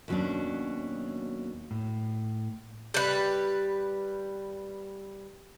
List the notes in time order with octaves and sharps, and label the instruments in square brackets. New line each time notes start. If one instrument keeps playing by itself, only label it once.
[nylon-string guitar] D#2 B2 F#3 C#4 D4
[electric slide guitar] A2
[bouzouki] G3 B4